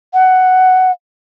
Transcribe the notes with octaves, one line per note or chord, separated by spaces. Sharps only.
F#5